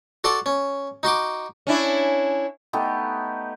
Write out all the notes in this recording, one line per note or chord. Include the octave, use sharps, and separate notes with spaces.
F#4 A4 D5 C6
C#4
D#4 F#4 C6 D6
C#4 D4 E4
A3 B3 D#4 G4